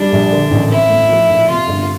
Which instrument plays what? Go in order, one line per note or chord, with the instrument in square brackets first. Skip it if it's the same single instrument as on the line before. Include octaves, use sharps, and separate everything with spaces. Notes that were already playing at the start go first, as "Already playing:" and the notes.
Already playing: [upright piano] G3 [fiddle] D4
[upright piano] A#1
D3
A1
[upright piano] C4 [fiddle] E4
[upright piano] A2
F3
A#1
[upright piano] C3 [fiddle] F4
[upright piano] G1